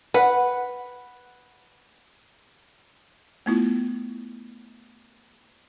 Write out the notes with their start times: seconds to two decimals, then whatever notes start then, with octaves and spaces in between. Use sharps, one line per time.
0.14 B4 F#5
3.46 A3 B3 E4 F4